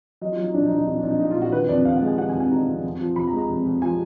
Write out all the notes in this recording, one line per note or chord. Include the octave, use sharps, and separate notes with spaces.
F#3 D#5
F4
F#3
D#4
A#1 D4
D#4
A#1
D#4
A#1 D#4
D4
A#1
D#4
A#2 D#4
F4
A#2
F#4
D#3 B4
F2 D5
F2 F5
F#5
G#3
G#5
D#3 F#5
G#5
F2
G#5
D#3 A#5
F2
F2
F3
F2 B5
A#5
G#3
A#5
F2
F2
F3 G#5